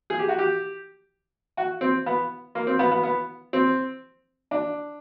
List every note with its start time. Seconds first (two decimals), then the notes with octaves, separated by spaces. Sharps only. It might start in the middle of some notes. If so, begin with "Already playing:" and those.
0.10 G#4
0.19 G4
0.29 F#4
0.38 G4
1.57 F#4
1.81 C4
2.06 B3
2.55 A#3
2.67 C4
2.79 B3
2.91 B3
3.03 B3
3.53 C4
4.51 D4